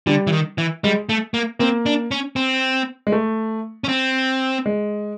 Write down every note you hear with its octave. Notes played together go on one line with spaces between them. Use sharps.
D3 G3
E3
D#3
E3
G3 G#3
A3
A#3
A#3 C4
D4
C#4
C4
G#3
A3
C#4
C4
G#3